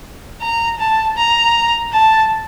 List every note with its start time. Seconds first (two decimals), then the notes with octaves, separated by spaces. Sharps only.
0.42 A#5
0.80 A5
1.17 A#5
1.93 A5